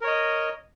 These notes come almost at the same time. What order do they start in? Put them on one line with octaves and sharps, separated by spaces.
A#4 C#5 D#5